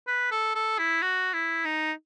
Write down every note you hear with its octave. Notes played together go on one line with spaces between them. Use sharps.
B4
A4
A4
E4
F#4
E4
D#4